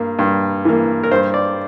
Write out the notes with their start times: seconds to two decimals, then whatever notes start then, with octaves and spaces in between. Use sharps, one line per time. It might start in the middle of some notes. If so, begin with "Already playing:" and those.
Already playing: G2 A#3
0.19 G2
0.65 E3 A#3
1.04 A#4
1.11 G2 C5
1.34 D5